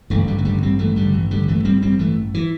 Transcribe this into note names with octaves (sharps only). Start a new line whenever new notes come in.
A1 G2 D3 E3 A3
D3 G3
A3
D3 G3
G3 C4
E3 A3
D3 G3
E3
D3 G3
E3 A3
G3 C4
G3 C4
E3 A3
E3